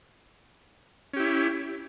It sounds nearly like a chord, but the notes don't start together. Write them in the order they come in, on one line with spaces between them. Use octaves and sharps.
C#4 G4 E4